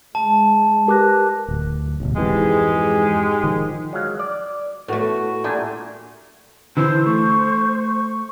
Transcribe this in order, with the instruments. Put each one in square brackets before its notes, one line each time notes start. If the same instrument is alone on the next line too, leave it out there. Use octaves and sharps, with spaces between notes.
[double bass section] G#3 [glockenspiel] A5
[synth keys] G4 B4 A#6 [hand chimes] A#4 D6 F#6
[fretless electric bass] D1
D1 B1
[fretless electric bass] F2 E3 [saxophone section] G#2 G#3 G4
[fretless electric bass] D#3 F3
[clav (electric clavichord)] F#3 G#3 F5
D5
[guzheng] A2 A3 [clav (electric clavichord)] B3 [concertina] F#4
[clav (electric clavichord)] A#2 A3 [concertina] D4 G#5 [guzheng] G4
[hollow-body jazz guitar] D3 E3 [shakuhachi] C5 [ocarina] E6
[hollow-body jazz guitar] A3 [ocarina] C#6